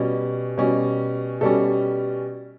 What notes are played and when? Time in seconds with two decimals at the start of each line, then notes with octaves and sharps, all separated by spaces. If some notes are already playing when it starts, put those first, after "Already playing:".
Already playing: B2 G3 C#4
0.58 B2 G3 C#4
1.41 B2 G3 C#4 A4